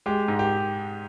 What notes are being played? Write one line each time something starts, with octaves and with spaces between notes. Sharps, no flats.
G#3 G4
G#2
G4